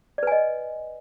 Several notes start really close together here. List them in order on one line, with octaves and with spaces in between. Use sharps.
D5 B4 G#5 D#5